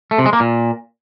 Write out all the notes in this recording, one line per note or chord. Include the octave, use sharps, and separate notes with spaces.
A3
C3
G#3
A#3
A#2